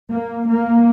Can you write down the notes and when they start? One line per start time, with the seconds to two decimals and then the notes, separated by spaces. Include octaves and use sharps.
0.11 A#3
0.49 A#3